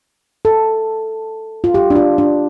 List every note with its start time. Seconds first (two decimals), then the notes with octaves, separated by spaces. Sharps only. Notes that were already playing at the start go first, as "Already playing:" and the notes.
0.45 A4
1.64 F4
1.74 G4
1.90 D4
1.95 F4
2.18 D4